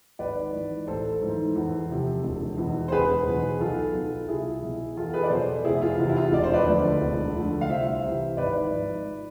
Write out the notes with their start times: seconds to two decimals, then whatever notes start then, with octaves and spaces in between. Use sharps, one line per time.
0.19 G#1 B4 D5
0.53 G#2 E3
0.87 A1 A4 C5
1.21 G#2 E3
1.55 E2
1.90 C3 F3
2.24 E1
2.58 E2 B2
2.88 C5
2.92 E1 G#4 B4
3.26 E2 B2
3.60 B1 F4 A4
3.95 B2
4.28 C2 E4 G#4
4.62 B2
4.97 E2 F4 A4
5.14 G#4 B4
5.23 D5
5.30 B2 A4 C5
5.65 F1 E4 G#4
5.82 F4
5.98 E2 C3 F4
6.09 E4
6.16 F4
6.32 E1 D5
6.43 C5
6.53 B4 D5
6.66 D2 D3 F3
7.01 E1
7.35 D2 D3 F3
7.61 F5
7.69 C2 C5 E5
8.03 C3 E3
8.37 G#1 B4 D5
8.71 G#2 F3